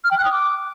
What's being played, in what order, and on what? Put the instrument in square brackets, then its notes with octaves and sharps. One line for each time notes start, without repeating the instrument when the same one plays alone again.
[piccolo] F6
G5
F#6
D#6
D6